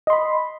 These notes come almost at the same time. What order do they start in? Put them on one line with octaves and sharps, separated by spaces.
D#5 C6 B5